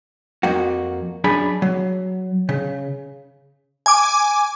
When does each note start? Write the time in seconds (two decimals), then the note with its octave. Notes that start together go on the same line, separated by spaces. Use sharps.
0.43 F2 A#3 F#4
1.24 F#2 D4 G#4 B5
1.62 F#3
2.49 C#3
3.86 G#5 D6